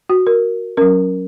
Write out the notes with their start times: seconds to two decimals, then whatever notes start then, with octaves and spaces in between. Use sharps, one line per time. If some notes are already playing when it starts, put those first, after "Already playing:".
0.09 F#4
0.27 A#4
0.77 F#3 C#4 A#4